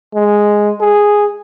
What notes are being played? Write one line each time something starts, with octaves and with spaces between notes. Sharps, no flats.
G#3
G#4